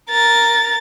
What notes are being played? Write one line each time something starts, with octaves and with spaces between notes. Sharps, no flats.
A#4 A6